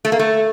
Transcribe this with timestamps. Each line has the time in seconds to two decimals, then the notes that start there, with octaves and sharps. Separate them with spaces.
0.05 A3
0.12 A#3
0.19 A3